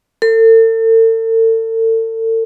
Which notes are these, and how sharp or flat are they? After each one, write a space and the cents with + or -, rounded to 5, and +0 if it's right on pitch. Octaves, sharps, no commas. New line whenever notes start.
A4 +40